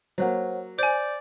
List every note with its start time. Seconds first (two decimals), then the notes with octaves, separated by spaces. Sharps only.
0.18 F#3 A#3 C5 C#5 F#5
0.79 C5 D5 G#5 G6